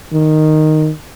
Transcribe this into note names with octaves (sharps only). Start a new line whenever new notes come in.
D#3